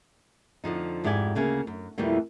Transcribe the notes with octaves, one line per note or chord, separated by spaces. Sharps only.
F2 D3 F3 D#4
F2 G#2 E4 G4 D5 G#5
D2 C#3 A#3 G#5
F#2
F2 B2 E3 G3 A3 A#3